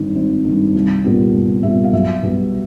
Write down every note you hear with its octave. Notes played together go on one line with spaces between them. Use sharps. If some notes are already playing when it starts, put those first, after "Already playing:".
Already playing: G#1 G2 D#3
G#1
G2 D#3
C2
A#2 G3 B3
C2
A#2 G3 B3 E5
F5
B1 E5
B2 G3 B3